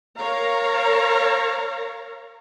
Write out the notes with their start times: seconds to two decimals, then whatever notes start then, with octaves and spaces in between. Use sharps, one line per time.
0.20 A#4 C#5 F5 A#5